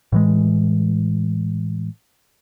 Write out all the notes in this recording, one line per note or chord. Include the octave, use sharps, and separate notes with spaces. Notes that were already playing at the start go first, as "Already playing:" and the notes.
A2 E3 G#3